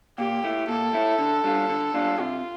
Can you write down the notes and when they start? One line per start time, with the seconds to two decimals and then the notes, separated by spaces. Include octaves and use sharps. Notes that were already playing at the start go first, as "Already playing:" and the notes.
0.18 A#2 G4
0.44 A3 E4
0.68 A#2 A4
0.93 A3 E4
1.19 D3
1.44 G3 D4 F4
1.69 D3
1.94 G3 D4 F4
2.19 C3 F4